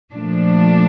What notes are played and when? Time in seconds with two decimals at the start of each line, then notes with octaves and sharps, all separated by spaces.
0.13 A#2 F3 A3 D4